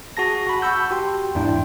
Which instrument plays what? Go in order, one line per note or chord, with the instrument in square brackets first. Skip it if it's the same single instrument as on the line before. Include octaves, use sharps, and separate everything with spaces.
[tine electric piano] F#4 G#4 A5 A#6
F#4 B5
F#5 A5 B5 C#6 E6 G6
F#4 G4 G5 C6
E2 G#2 D4 E4 G5 C6